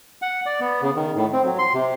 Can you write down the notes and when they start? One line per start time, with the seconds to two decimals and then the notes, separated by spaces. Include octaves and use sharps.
0.22 F#5
0.46 D5
0.60 B3
0.82 C#3
0.96 D#3
1.16 A2
1.33 C4
1.44 F#3
1.59 C6
1.74 C3